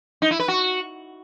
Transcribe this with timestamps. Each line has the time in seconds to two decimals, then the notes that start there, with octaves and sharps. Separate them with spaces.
0.22 D#4
0.31 E4
0.39 B4
0.48 F#4